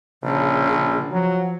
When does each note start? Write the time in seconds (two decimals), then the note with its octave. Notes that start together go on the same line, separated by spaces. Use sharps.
0.23 A#1 C#3
1.11 F3 F#3